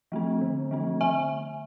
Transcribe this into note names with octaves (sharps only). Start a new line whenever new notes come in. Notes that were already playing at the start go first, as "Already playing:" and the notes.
F3 A3 C4
D3
F3 A3 C4
D3 E5 G#5